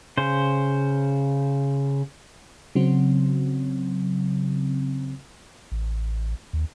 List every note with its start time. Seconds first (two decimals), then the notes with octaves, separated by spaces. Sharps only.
0.17 C#3 C5
2.75 C#3 F#3 C4
5.72 A1
6.53 D#2